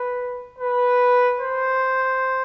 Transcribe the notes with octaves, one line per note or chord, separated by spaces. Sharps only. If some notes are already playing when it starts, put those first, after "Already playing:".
Already playing: B4
B4
C5